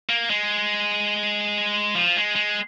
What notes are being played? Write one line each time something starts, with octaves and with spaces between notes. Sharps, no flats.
A#3
G#3
F3
G#3
G#3